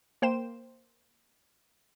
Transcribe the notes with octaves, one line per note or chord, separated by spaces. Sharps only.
A#3 C5 G5 E7